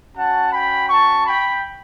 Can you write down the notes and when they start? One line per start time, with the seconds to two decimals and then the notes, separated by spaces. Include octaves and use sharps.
0.16 C#4 F#4 F#5 A5
0.53 G5 B5
0.89 A5 C#6
1.26 G5 B5